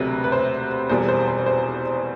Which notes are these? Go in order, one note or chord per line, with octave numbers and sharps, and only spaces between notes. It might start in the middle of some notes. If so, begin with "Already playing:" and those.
Already playing: E1 D2 C3 F#3 B4
B4
C5
E1 E2 B2 G3 C5
C5
C5
C5